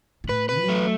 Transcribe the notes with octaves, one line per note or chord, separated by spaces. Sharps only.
B2
A2 B4
B4
F#3
A3